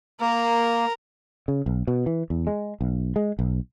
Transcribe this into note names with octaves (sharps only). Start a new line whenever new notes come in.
A#3 A#4
C#3
B1
B2
E3
E2
G#3
B1
G#3
B1